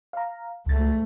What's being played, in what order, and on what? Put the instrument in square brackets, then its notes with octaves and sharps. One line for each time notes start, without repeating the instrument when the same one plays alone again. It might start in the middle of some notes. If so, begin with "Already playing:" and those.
[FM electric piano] F5 A#5
[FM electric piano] C#2 A6 [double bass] G#2 A3